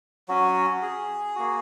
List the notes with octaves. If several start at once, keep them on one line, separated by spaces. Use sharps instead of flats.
F#3 C#4 F#4
G#4
A#3 F#4